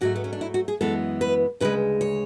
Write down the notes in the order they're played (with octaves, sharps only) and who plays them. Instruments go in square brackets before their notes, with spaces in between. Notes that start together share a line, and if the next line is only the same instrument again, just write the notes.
[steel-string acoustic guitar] G#2 F#3 A3 F#4
B3
C#4
D4
E4
F#4
G#4
F#2 E3 G#3 B3 A4
B4
D2 C#3 G#3 B4
C#5